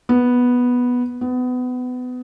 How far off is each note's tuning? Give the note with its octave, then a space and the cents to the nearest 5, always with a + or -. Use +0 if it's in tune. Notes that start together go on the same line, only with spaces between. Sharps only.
B3 -5
B3 +25